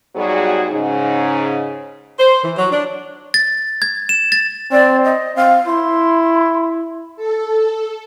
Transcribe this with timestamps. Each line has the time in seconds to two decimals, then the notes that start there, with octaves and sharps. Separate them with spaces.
0.16 G#2 F#3 G3 B3 F#4 G#4
0.71 G#2 C#3 D#4
2.19 C5
2.43 E3
2.57 F#3
2.71 D4
3.34 A6
3.82 G#6
4.09 E7
4.32 A6
4.72 C4 D5
5.05 D#5
5.36 C4 F5
5.66 E4 C6
7.16 A4